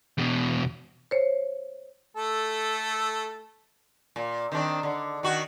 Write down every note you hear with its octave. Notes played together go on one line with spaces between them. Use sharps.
E2 B2
C5 C#5
A3 A4
A#2
D#3 C4 D4
D3
D#3 F#4